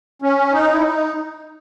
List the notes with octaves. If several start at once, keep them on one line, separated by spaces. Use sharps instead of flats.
C#4
D#4
E4
D#4